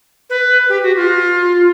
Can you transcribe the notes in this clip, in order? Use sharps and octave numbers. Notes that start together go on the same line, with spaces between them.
B4
G4
F#4
F4